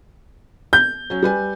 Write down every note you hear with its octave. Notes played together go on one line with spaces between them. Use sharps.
G6
F#3 C#4
G3 B4 G#5